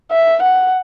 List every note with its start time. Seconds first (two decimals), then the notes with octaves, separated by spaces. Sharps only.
0.11 E5
0.43 F#5